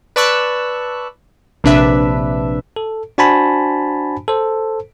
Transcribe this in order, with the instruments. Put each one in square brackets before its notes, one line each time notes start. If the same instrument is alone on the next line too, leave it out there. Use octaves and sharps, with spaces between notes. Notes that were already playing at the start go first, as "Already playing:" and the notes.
[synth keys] B4 D5 A5 C#6 E6 F#6
A#1 C3 D4 B4 E5
[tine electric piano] A4
D4 F#4 C5 G#5 A5 B5
A4 C5